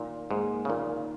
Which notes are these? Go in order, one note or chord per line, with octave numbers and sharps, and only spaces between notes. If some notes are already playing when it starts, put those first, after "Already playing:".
Already playing: A#2 D#3
G#2 A#3 D#4 G#4
C#3
A#2 D#3